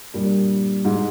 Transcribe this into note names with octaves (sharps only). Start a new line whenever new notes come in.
G2 A#2
G#2